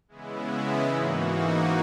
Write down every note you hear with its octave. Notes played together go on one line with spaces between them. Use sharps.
C#3 E3 G#3 B3 E4
G#2 E3 A#3 D#4 F#4